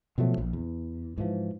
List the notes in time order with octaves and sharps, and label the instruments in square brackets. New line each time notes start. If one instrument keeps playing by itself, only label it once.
[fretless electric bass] B2 F3 F#3 A3
A#1
E2
G#2 E3 F3